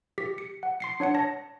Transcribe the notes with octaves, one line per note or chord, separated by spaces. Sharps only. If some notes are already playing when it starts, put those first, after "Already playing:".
G4 B6
C#7
F#5
C6 C7 C#7
D4 C#5 F#5 C#7
C#5 A5 A#6